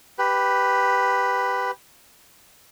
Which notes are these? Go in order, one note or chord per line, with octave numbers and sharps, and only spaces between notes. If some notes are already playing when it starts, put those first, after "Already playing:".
G4 B4